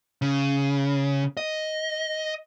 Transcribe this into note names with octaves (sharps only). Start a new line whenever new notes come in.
C#3
D#5